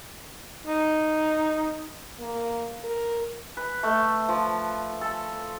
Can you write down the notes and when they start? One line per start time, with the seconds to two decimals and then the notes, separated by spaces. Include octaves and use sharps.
0.67 D#4
2.19 A#3
2.84 A#4
3.57 B4
3.83 A3
4.29 F3
5.01 A4